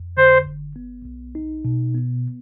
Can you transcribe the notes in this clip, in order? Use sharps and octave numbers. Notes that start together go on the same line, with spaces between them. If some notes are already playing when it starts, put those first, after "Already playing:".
Already playing: F2
D3 C5
G1
B3
B1
D#4
B2
B3